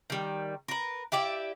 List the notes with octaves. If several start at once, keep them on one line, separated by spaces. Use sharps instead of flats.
D#3 G3
A#4 B4
E4 G4 D5 E5